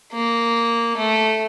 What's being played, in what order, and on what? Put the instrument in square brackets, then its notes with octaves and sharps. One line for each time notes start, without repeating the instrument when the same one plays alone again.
[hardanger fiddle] A#3
A3